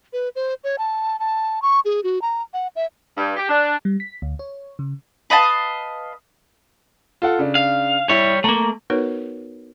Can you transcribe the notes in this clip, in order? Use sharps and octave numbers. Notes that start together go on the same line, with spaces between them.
B4
C5
C#5
A5
A5
C#6
G#4
F#4
A#5
F#5
E5
G2
G4
D4
G3
B6
D2
C#5
C#3
B4 D#5 F5 A5
F4 A4 F#5
C#3 D4
F5
G3 E4 C#5
A3 A#3 A#5
B3 D#4 F#4 A#4 B4 C#5